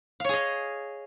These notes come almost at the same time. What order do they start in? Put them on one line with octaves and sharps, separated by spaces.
F5 C#5 G#4 D#5